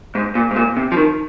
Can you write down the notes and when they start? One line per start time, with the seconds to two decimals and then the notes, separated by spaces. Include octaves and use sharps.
0.15 G#2
0.35 A#2
0.51 G#2
0.56 A#2
0.77 C3
0.92 F3
0.97 D#3